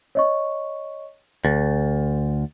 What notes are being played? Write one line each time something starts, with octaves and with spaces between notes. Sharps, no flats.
C#5 D#5 C#6
D2 A6